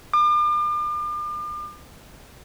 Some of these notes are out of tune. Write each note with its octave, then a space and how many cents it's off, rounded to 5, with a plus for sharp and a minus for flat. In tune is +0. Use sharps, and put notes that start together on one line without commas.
D6 +40